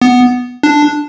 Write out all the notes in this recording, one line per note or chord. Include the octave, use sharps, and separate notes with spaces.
B3
D4